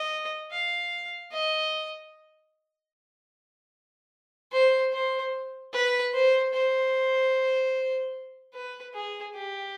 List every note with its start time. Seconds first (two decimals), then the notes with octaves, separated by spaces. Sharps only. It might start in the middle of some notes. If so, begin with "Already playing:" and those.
Already playing: D#5
0.51 F5
1.32 D#5
4.52 C5
4.93 C5
5.73 B4
6.13 C5
6.53 C5
8.54 B4
8.94 G#4
9.34 G4